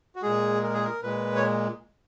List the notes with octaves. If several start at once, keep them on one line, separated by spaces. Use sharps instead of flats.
F#4
A#2 G#3 G#4
A#4
G#4
A#4
A#2 G#3 B4
C#5